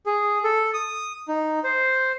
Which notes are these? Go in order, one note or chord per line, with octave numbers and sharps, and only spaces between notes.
G#4
A4
D#6
D#4
C5